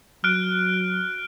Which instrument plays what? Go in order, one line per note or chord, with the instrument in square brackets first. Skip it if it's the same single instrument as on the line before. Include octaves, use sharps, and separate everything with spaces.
[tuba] F#3 [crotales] F6 F#6 D7